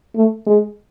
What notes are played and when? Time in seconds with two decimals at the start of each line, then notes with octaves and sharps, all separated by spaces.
0.15 A3
0.47 G#3